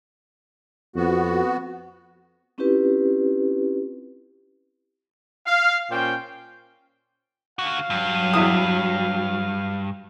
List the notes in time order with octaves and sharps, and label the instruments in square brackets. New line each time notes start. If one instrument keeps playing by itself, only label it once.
[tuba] F2 [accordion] B3 F#4
[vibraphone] C4 C#4 E4 F4 G4 B4
[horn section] F5
A#2 C#4 C5 G5
[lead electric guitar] D3 F#4 [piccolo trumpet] F5
[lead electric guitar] G2 [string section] F#3
[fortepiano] E2 E4 D#6